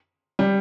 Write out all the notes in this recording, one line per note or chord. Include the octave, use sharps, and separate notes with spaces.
G3